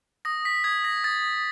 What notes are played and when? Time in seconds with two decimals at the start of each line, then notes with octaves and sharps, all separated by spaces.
0.25 D#6 A#6
0.45 B6
0.64 D#6 G#6
0.84 A#6
1.04 D#6 A6